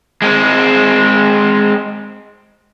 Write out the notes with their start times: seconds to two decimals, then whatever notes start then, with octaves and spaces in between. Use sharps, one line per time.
0.22 G#3 C4